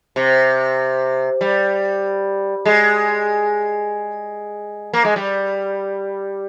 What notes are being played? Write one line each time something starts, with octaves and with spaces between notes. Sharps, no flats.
C3
G3
G#3
A#3
G#3
G3